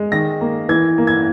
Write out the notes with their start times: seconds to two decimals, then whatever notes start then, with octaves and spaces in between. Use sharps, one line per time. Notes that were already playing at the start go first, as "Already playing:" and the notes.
Already playing: G#3
0.12 D#3 A#6
0.41 A#3
0.69 E3 G#6
0.98 A#3
1.07 G#6